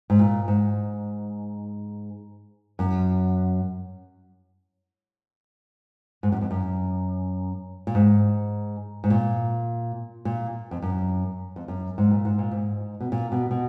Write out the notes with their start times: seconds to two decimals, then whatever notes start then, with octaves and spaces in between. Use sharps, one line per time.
0.10 G#2
0.19 A#2
0.48 G#2
2.79 F#2
6.23 G#2
6.32 F#2
6.41 F2
6.51 F#2
7.87 A#2
7.95 G#2
9.04 G#2
9.10 A#2
10.25 A#2
10.71 F2
10.82 F#2
11.56 F2
11.68 F#2
11.98 G#2
12.11 A#2
12.25 G#2
12.39 A#2
12.51 G#2
13.00 B2
13.12 A#2
13.32 B2
13.51 B2